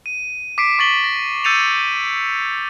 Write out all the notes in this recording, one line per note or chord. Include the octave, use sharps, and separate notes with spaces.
D#7
D6 B6 C7 D7
C#6 D6 A6 B6 F#7 G7
A#6
E6 G6 A6 C#7 D#7 F7